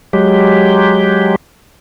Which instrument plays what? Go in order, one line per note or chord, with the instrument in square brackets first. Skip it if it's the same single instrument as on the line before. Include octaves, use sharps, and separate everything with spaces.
[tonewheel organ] F#3 G#3 G4